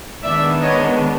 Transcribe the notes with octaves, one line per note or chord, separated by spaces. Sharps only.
D#3 G#3 B3 D4 D5 E5
C#5 D#5